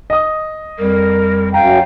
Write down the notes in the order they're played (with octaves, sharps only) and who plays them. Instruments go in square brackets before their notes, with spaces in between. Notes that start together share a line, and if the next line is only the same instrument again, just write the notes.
[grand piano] D#5 D#6
[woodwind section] F2 G3 [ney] A#4
[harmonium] F#2 G5 [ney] F5 [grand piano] A#5